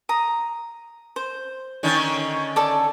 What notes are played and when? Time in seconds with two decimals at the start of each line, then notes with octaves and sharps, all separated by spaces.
0.09 A#5 D#6
1.16 C5
1.83 D3 D#3 C#4
2.56 A4 D5 A5